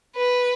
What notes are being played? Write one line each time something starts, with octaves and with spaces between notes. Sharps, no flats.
B4